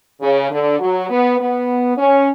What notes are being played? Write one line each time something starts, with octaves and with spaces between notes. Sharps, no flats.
C#3
D3
F#3
B3
B3
C#4